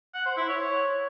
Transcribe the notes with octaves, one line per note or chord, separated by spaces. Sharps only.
F#5
C5
E4
C#5